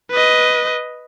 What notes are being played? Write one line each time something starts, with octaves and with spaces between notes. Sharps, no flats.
B4 D#5